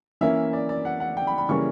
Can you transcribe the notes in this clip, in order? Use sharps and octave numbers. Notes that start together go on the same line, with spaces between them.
E3 A#3 C#4 E5
D5
D5
F#5
F#5
G5
B5
B5
C#3 E3 G3 A#3 C#4 C#6